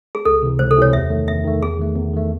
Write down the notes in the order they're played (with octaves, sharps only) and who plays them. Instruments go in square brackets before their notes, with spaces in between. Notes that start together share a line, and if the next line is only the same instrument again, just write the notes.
[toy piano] G#4
[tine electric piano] C#2 [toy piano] A4
[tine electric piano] C3 E3
[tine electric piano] C#2 [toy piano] C5
[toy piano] A4
[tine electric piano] C3 E3 [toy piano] C#5
[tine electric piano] E2 [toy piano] E5
[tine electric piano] D#3 A3
[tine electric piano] E2 [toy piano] E5
[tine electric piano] D#3 A3
[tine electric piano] E2 [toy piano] G#4
[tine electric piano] D#3 A3
E2
D#3 A3